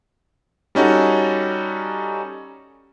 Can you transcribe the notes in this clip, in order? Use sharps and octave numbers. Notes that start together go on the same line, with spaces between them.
G3 C#4 D#4 F#4 A4